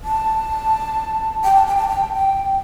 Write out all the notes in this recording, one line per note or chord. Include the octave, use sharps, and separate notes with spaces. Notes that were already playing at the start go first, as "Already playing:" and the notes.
A5
G5
A5
G5
A5
G5
G5